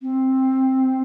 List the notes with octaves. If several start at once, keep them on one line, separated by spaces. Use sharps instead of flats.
C4